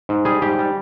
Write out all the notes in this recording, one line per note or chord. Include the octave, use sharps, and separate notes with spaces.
G#2
G3 G#4
G#2 G4
G3